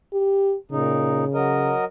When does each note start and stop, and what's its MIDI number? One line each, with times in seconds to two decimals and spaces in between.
0.13 0.55 67
0.71 1.25 46
0.71 1.74 49
0.71 1.25 63
1.34 1.85 54
1.34 1.85 70
1.34 1.85 75